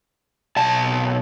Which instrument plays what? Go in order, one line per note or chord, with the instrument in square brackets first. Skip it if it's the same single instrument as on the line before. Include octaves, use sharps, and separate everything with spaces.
[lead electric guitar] B1 A5